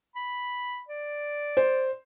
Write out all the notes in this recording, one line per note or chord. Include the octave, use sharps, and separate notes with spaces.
B5
D5
C5